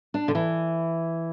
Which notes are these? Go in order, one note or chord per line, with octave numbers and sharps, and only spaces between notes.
D4
D3
E3